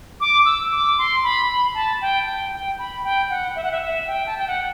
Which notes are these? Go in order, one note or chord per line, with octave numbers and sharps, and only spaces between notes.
D6
E6
D6
C6
B5
B5
A5
G5
G5
G5
B5
G5
F#5
E5
F#5
E5
E5
G5
A5
G5
F#5